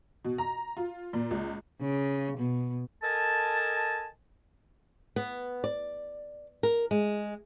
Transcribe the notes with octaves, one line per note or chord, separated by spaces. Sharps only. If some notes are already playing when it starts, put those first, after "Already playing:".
B2
A#5
F4
A#2
C#2
C#3
B2
A4 A#4 D#5 G#5 A5
B3
D5
A#4
G#3